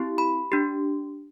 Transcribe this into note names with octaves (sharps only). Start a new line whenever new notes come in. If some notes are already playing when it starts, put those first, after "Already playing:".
Already playing: C4 E4 G4
B5
D4 G4